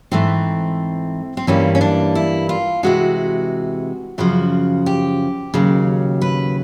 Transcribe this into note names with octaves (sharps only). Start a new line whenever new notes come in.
G#2 E3 A3 C4
C4
G2 E3 G3 A#3 C#4
C#4
D4
E4
F4
C3 E3 G#3 F#4
F#2 C#3 F3 F#4
G4
D#2 C#3 F#3
B4